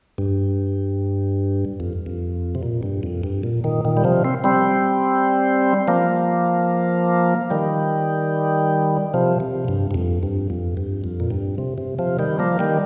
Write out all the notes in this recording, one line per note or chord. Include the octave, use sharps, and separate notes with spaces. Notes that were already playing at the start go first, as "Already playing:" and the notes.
G2
F2
F2
C3
A#2
G2
F2
G2
A#2
A#2 D#3
A#2 D#3
G3
C3 F3
C4
G3 C4
F3 A#3
D#3 G3
C3 F3
C3
G2
G2
F2
G2
F2
G2
F2
A#2
G2
C3
C3
C3 F3
D#3 G3
F3 A#3
D#3 G3